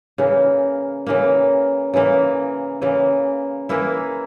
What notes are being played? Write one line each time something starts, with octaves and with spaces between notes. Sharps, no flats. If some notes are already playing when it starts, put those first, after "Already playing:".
C#3 E3 A#3
C#3 E3 A#3
C#3 E3 A#3
C#3 E3 A#3
E3 A#3 E4